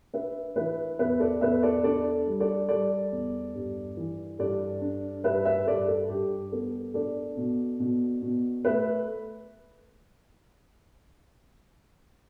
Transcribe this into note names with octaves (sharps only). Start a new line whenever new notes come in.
D4 B4 E5
E3 B4 E5
E2 B4 E5
A4 D5
E2 B4 E5
A4 D5
D4 A4 D5
G3
A4 D5
G3 A4 D5
E2
G2
E3
G2 A4 D5
D4
G2 B4 E5
B4 E5
G2 A4 D5
A4
G2 G4
B3 A4
D4 A4 D5
B2
B2
B2
A3 B4 E5